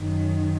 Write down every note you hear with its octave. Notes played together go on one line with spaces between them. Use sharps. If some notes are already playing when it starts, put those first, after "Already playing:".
Already playing: F#2 D#3